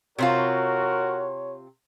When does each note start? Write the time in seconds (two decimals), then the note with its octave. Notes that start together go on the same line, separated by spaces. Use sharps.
0.18 C3 C4 F4 F#4 A#4 C#5